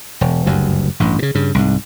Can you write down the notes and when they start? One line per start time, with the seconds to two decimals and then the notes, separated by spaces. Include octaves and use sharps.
0.21 E1
0.46 F#1 D2 G2
1.00 A1 G2
1.19 A#2 C#3
1.35 G2 C#3
1.55 C2 G#2